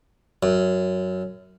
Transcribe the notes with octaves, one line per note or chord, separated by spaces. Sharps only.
F#2